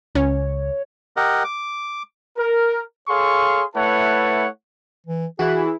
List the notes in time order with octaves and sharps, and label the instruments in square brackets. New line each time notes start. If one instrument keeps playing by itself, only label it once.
[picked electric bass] C#2 [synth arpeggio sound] C#4 [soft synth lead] C#5
[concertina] G4 A#4 D#5 F#5
D6
[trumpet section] A#4
G#4 A4 C#5 F5 C6 C#6
A3 E4 B4 C#5 F#5 A5
[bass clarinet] E3
[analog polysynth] E3 E4 [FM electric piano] F#4 F#6 [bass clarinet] G#4